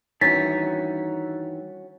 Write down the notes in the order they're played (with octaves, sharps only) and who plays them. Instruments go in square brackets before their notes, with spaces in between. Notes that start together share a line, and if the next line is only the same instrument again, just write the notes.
[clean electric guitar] G2 D#3 E3 [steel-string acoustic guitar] C#4 F#4 [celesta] A6 B6